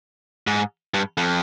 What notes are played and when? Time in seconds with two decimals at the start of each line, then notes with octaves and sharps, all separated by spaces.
0.47 G#2
0.94 G2
1.17 F2